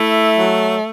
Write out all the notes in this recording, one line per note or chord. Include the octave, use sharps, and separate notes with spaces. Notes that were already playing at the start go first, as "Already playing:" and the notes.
Already playing: A3 E4
F#3